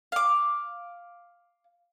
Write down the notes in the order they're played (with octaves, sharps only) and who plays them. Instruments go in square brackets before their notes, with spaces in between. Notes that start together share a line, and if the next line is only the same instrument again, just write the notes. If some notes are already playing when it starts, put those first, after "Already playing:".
[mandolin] F5 D6